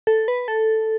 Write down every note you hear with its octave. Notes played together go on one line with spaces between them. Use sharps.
A4
B4
A4